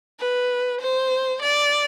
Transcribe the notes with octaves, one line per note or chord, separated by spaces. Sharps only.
B4
C5
D5